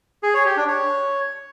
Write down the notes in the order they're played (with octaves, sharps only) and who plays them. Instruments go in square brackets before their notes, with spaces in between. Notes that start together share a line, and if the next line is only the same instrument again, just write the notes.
[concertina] G#4
C#5
G4
D4
C#5